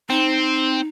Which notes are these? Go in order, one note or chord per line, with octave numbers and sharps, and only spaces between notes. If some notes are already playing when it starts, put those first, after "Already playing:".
C4 D#4